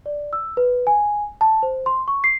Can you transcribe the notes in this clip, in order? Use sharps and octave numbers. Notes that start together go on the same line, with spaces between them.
D5
E6
B4
G#5
A5
C5
C6
C#6
C7